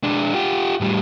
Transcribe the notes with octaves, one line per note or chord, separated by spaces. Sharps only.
G#3 D4
F4 G4
A2 G3